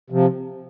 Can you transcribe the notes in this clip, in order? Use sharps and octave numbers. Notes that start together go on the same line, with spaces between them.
C3 F3